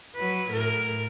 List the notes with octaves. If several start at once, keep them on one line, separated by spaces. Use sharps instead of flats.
F#3 B4
A2 A#4